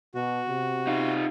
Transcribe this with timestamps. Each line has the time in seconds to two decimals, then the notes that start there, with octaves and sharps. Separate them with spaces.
0.15 B2 F#4
0.49 C3
0.87 D#4 F4